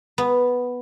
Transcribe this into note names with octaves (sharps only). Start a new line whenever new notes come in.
B3